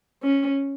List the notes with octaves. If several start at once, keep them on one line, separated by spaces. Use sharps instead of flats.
C#4